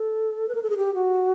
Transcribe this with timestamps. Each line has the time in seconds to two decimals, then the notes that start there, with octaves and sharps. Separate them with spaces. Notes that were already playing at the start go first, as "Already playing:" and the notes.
Already playing: A4
0.48 B4
0.55 A#4
0.63 A4
0.70 G#4
0.77 G4
0.94 F#4